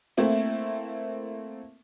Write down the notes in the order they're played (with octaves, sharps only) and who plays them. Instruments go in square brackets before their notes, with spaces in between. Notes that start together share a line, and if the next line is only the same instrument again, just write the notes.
[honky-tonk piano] A3 A#3 C4 E4